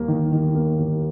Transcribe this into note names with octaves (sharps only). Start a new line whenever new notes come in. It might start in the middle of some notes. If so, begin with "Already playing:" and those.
Already playing: D#2 G3 A#3
D#3
D#3
A#3
D#2